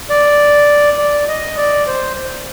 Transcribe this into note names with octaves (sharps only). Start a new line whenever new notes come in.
D5
D5
D#5
D5
C5